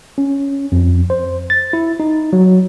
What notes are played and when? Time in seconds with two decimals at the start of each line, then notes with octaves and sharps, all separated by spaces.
0.18 C#4
0.72 F2
1.10 C5
1.50 A6
1.73 E4
2.00 D#4
2.33 F#3